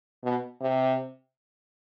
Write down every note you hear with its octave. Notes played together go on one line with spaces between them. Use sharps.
B2
C3